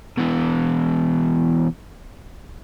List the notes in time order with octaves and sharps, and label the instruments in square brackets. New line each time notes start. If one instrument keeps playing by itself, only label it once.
[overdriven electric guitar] B2 E3